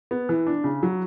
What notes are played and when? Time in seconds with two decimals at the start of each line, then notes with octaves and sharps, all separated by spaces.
0.11 B3
0.29 E3
0.47 D4
0.64 C#3
0.83 F#3